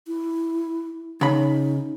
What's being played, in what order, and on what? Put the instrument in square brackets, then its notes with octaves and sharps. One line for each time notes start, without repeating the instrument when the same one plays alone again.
[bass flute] E4
[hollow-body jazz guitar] C#3 B5 [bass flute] D#4